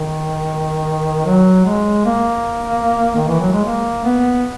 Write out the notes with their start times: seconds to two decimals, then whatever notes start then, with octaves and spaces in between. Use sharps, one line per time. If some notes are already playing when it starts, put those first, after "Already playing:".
Already playing: D#3
1.26 F#3
1.66 G#3
2.06 A#3
3.16 D#3
3.28 E3
3.40 F#3
3.52 G#3
3.64 A#3
4.04 B3